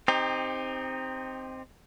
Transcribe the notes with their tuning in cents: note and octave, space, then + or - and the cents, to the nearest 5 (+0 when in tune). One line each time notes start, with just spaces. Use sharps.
C4 +0 D#4 +0 G4 +30